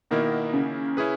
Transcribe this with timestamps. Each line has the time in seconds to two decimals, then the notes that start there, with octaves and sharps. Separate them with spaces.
0.11 B2 D#3 A#3 E4 A#4
0.53 C#3
0.97 C#4 E4 G#4 B4